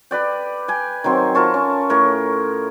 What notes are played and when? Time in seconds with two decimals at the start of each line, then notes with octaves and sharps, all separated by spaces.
0.11 G4 B4 D5 G5
0.68 G5 G#5
1.04 D#3 F#3 C4 C5
1.35 F4 A#4 A5 C#6
1.54 C#4
1.90 A2 A#4 C#5 C#6